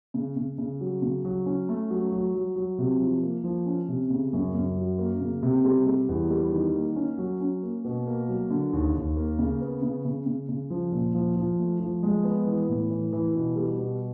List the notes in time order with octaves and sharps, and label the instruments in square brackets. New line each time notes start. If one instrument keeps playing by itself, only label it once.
[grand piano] C#3
C#3
C#3
F#3
C#3
F#3
C#4
A3
F#3
F#3
F#3
F#3
C3
F3
A#3
F3
C#4
C3
C#3
F#2
F#2
F#3
A#3
C#3
C3
G3
G3
E2
G3
D#3
A#3
C#4
F#3
C#4
A#3
B2
A#3
F#3
D3
D#2
D#2
A#3
C#3
B3
C#3
C#3
C#3
C#3
F3
A#2
F3
F3
A3
F3
G#3
B3
E3
A2
E3
E3
B2
G3
B2